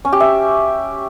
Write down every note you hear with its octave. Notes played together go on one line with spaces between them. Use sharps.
C#4
G4
E5